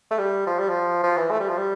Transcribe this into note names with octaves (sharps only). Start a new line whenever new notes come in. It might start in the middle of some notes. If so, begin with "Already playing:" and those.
A3
G3
F3
G3
F3
F3
E3
A3
G3
F3
G3